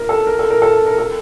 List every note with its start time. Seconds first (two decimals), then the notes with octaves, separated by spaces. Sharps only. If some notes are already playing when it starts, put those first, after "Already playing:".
Already playing: A#4
0.09 A4
0.27 A#4
0.39 A4
0.50 A#4
0.62 A4
0.86 A#4
0.98 A4